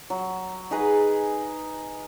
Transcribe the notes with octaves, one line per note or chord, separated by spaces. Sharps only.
F#3
D#4 G#4 B4 D#5